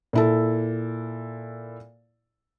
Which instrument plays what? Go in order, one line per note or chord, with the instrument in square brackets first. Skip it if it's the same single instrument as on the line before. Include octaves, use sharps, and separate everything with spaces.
[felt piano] A#2 E4 A4